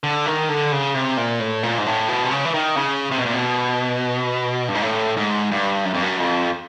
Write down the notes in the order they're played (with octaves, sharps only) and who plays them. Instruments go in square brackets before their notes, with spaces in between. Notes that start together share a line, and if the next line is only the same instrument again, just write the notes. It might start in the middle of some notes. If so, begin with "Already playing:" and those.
[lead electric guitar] D3
D#3
D3
C#3
C3
A#2
A2
A#2
G#2
A2
B2
C3
C#3
E3
D#3
C#3
C3
B2
A#2
B2
G2
G#2
A2
G#2
G2
F#2
F2
F#2
F2